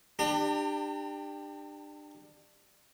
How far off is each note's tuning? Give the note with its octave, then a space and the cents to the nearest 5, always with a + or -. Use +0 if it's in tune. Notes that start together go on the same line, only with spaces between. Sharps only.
D4 +30 G4 +15 A#5 -45